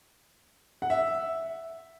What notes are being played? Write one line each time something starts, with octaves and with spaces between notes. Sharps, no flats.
F#5
E5